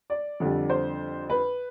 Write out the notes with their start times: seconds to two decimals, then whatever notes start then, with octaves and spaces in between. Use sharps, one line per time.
0.10 D5
0.40 F2 D3 G3
0.70 C5
1.30 B4